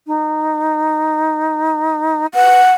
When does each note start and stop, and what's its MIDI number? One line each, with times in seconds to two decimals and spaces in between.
0.07 2.26 63
2.34 2.60 71
2.34 2.75 78